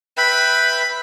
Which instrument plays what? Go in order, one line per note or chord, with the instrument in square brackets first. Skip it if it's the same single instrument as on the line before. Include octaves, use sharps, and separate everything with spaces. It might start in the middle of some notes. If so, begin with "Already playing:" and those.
[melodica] B4 E5 G5 [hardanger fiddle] B5